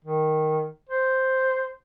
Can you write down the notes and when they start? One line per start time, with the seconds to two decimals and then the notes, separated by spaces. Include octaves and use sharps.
0.05 D#3
0.89 C5